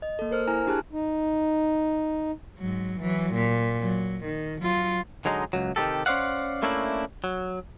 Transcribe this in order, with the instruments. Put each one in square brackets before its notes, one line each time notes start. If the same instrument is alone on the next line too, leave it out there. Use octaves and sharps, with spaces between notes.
[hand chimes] D#5
A#3 A4
A#4 C5 F6
E4 G#5 A#5 F6
D4 G4 G#4 A5 F#6
[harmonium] D#4
[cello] G#2 F#3
E3 F#3
A#2
F#3
D#3
F#3 F4
[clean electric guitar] D3 F#3 G#3 D#4
C#2 F#3
C3 D#3 F#3 A3 G4 A4
C#4 C5 D5 F5 F#5
A3 A#3 C#4 D4 E4
F#3